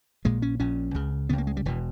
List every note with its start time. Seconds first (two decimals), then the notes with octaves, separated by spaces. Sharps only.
0.25 A#1 A#2 G#3
0.42 C#4
0.60 A#1 A#2 C#4
0.94 C#2 C#3
1.29 C#2 C#3 B3
1.38 A#3
1.47 G#3
1.57 G3
1.65 E1 B2 E3